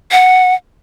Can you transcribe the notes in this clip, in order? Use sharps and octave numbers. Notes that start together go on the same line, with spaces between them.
F#5